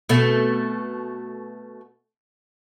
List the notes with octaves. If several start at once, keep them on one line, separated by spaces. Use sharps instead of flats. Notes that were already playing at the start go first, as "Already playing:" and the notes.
B2 A3